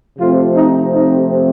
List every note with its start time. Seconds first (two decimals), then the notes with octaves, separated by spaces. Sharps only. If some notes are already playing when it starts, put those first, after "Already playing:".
0.18 C3 F3 A3 C4 F4
0.55 D#4
0.92 D#4